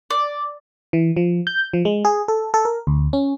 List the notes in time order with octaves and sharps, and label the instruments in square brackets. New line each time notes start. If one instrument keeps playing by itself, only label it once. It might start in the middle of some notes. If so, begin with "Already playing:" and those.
[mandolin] D5
[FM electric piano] E3
F3
G6
F3
G#3
G#4
A4
A4
A#4
D2
C#4